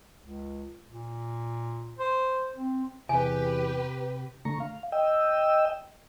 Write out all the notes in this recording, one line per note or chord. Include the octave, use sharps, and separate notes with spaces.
C#2
A#2
C5
C4
E2 C3 G4 B4 G#5
D3 A3 A#5 C#6
F5
D#5 G5 E6